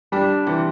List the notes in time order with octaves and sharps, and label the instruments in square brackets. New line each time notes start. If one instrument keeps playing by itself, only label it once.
[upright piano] G3 [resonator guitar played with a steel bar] D4
[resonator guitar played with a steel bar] C3 [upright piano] E3